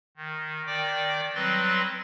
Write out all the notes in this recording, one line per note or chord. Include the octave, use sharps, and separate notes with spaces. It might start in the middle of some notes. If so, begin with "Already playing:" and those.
D#3
D#3 D5 G5 D6
F#3 G3 C4 B4 C6 A#6